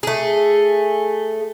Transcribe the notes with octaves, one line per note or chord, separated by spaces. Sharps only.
A3 G#4